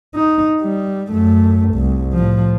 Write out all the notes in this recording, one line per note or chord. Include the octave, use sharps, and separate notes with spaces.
D#4
G3
F#2 A3
C2
A2 F3